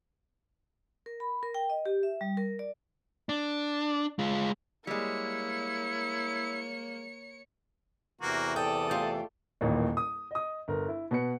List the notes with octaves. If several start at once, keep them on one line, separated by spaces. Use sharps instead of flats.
A#4
B5
A#4
G5
D#5
G4
E5
G3
A#4
D5
D4
G#3 F4
G3 G#3 A#3 E4 C#5 C#7
E2 C3 E3 A#3 F#4
A4 D5 G5 D#6
A3 F4 G4
D#1 A1 D#2 A#2
D#6
D#5 D#6
G1 A#4
E4
B2 B4 C#7